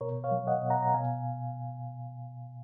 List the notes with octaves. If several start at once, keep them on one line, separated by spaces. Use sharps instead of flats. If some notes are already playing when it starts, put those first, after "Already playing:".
B2 A#4 C#5
C#5 F5
F#3
D#5 F#5
B2
F#5 A#5
A#5
B2 F5 G#5